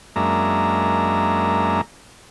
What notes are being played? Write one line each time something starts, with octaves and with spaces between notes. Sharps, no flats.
F#2 G#3 A#3 D4 E5 A#5